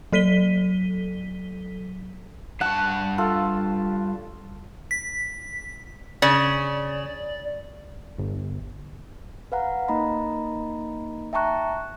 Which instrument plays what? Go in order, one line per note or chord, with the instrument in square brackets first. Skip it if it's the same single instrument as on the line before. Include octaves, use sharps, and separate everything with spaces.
[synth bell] F#3 A4 B6 D#7 G7
[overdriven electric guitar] G2 A5 [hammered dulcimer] F#5 C#6
[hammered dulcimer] F4 A4
[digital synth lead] B6
[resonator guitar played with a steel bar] C#3 [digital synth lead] D5
[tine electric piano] G1
[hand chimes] B4 F5 F#5 A#5
A#3 D#4 D#5 A#5 B5
E5 G5 A5 A#5 C#6 F#6